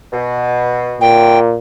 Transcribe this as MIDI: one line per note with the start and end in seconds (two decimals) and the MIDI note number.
0.13 1.15 47
1.01 1.58 46
1.01 1.39 79